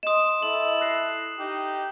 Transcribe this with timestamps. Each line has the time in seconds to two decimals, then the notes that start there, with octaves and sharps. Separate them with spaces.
0.03 D#5 C6 D#6 E7
0.43 E4 A4 F#7
0.81 F#6 A#6 C7
1.39 D#4 G4